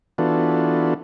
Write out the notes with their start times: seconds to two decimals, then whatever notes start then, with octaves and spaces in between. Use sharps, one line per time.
0.18 E3 B3 D4 F4 F#4 A4